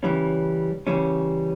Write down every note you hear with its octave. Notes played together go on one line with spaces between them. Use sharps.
C#3 E3 G3 C#4
C#3 E3 G3 C#4